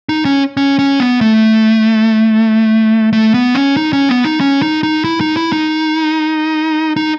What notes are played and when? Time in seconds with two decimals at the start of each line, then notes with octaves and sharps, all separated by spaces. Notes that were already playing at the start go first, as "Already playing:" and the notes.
0.09 D#4
0.25 C#4
0.57 C#4
0.79 C#4
1.00 B3
1.21 A3
3.13 A3
3.34 B3
3.55 C#4
3.77 D#4
3.93 C#4
4.09 B3
4.25 D#4
4.40 C#4
4.62 D#4
4.83 D#4
5.04 E4
5.21 D#4
5.37 E4
5.52 D#4
6.96 D#4